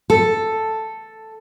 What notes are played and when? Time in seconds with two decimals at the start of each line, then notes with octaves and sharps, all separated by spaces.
0.10 A4